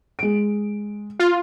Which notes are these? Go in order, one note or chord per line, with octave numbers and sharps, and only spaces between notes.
G#3 D7
F4